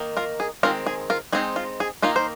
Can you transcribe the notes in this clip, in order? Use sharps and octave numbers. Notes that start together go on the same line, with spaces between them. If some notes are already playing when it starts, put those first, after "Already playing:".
Already playing: D#3 A#3 D#4
F4 A#4
G#4
D#3 G#3 C4 F4 A#4
G#4
F4 A#4
G#3 C4 D#4 G#4
F4
G#4
D#3 A#3 D#4 F4
C5